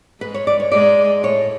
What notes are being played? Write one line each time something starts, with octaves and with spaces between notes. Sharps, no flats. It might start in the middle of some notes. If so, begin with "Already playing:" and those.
G#2 G#3 B4
C#5
D5
C#5
G#2 G#3 D5
A2 C#5